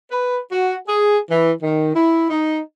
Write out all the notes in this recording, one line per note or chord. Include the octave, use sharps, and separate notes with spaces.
B4
F#4
G#4
E3
D#3
E4
D#4